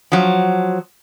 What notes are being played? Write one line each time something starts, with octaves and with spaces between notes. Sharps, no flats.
F3 F#3